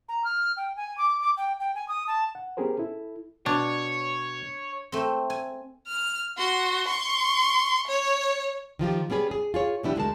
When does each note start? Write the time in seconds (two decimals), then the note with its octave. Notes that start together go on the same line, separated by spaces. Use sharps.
0.09 A#5
0.24 F6
0.57 G5
0.76 G#5
0.98 D6
1.21 D6
1.37 G5
1.60 G5
1.75 G#5
1.88 D#6
2.07 A5
2.35 F#5
2.57 B3 C#4 G4 G#4 A#4 C5
2.77 E4 A4
3.46 B2 D4 C#5
4.92 A3 C4
5.30 G#5
5.88 F6
6.37 F#4 C6
6.87 C6 C#6
7.87 C#5
8.79 D#3 F3 F4 G4
9.10 G3 B3 C#4 G#4 B4
9.31 G#4
9.54 F4 G#4 C#5
9.83 B2 E3 B3 D4 E4 G4
9.96 D2 G#3 A#4 A5